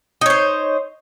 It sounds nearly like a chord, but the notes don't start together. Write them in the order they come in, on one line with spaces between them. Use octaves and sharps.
D#4 C#5 C5